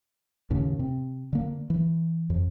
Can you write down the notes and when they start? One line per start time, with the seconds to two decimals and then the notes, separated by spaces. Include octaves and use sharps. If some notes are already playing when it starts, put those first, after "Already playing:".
0.50 D#2 A2 C#3
0.79 C3
1.33 D3 A#3
1.70 E3
2.30 F2